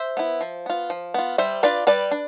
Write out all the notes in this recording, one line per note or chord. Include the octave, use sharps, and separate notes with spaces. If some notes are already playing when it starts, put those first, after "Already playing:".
Already playing: C5 E5
B3 E4
F3
B3 F4
F3
B3 F4
G3 C5 E5
D4 F4 B4 D5
G3 B4 D5
D4